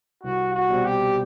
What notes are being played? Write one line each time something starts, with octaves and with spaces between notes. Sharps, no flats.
C2 F#4
F#4
B2 G3 C4
G4